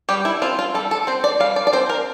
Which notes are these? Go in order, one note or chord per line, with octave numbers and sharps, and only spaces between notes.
G3 G4
E4
C4 F4
F4
G3 A4
A4
C4 C5
D5
G3 F5
D5
D5
C4 C5
A#4